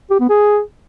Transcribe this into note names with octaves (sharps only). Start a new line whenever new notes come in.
G4
B3
G#4